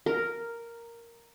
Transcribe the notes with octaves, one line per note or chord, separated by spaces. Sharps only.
A#4